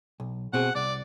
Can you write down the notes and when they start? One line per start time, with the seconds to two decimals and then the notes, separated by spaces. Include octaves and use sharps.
0.20 B1
0.53 B2 C4 G#4 F#5
0.75 C2 D5